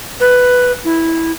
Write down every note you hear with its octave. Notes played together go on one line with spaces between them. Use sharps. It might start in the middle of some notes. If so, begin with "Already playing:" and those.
B4
E4